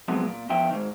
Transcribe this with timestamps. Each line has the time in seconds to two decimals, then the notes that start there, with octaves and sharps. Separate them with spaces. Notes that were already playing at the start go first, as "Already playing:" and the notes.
0.08 C3 F3 F#3 G#3 B3
0.26 A#2
0.50 E2 F3 E5 G5
0.70 G#2 D#3